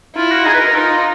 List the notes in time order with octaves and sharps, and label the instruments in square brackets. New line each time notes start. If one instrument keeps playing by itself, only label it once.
[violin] E4 [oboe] F4
[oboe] F#4
[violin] D#4 [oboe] G#4
[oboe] B4
A#4
[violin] D#4 [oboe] F4